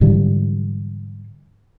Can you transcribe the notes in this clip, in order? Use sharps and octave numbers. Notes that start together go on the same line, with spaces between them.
G#2 D3 E3 G3